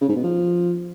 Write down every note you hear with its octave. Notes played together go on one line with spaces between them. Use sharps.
C#3
G#2
B2
F3